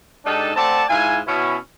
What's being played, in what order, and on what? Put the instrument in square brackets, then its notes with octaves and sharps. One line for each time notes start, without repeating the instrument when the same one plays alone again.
[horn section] G#2 D4 D#4 G4 A4 A5
A3 C4 D5 F#5 A5
G#2 E4 F4 G#5
B2 C#4 E4